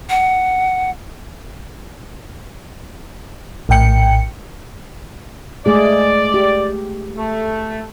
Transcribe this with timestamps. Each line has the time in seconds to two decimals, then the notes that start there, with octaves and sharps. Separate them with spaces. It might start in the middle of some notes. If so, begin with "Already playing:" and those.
0.10 F#5
3.69 A#1 A2 G5 C#7
5.66 G#3 A3 G#4 D5
6.34 G4
7.18 A3